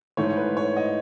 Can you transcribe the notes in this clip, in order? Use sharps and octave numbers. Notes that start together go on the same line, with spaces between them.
G#2 E3 A3 C#5
B4
C#5
D#5